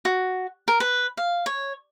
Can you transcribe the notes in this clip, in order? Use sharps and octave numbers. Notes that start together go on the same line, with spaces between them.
F#4
A#4
B4
F5
C#5